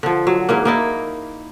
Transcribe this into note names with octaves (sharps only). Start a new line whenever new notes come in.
D3 F3
F#3
G#2 E3 A#3
A#3 D#4 E4